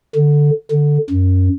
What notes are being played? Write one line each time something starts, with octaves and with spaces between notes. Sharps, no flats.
D3
D3
F#2